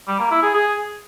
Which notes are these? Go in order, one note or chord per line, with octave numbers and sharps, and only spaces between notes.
G3
A#3
E4
G#4
G#4